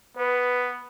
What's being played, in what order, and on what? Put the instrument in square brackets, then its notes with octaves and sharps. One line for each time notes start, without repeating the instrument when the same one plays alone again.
[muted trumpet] B3 [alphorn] B4